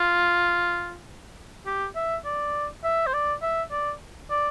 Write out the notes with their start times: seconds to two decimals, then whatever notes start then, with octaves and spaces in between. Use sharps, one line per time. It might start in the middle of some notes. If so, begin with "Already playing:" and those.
Already playing: F4
1.66 G4
1.96 E5
2.25 D5
2.84 E5
3.07 C5
3.13 D5
3.42 E5
3.71 D5
4.30 D5